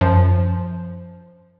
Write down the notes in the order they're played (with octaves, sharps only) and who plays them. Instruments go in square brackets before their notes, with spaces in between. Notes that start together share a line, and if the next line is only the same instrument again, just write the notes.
[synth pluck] F#2 F3